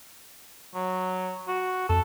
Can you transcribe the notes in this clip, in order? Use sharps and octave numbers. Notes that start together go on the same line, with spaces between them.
F#3
F#4
F2 A4